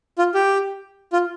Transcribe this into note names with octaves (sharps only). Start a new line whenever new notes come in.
F4
G4
F4